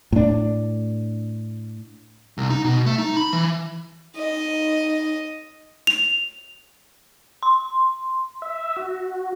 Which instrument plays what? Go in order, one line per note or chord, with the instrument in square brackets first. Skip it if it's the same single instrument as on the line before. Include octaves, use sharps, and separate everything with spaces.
[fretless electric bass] A2 D4
[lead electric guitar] C2
D#4
B2
A3
D#4
B5
E3
[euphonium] D#4 [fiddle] D#5
[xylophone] F7
[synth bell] C6
[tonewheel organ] E5
F#4